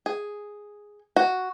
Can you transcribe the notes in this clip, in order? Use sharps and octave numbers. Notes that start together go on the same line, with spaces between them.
G#4
F#4